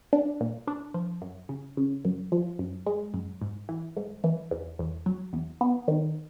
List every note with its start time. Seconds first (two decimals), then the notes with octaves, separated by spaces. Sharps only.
0.13 D4
0.40 A#2
0.68 D4
0.94 F3
1.22 F#2
1.49 C#3
1.77 C#3
2.05 F#2
2.32 F3
2.59 F#2
2.86 G#3
3.14 F#2
3.41 G#2
3.69 E3
3.97 G#2
4.24 E3
4.51 E2
4.79 E2
5.06 F#3
5.33 E2
5.61 B3
5.88 D#3